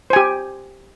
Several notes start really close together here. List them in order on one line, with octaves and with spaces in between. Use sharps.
C5 G#5 G4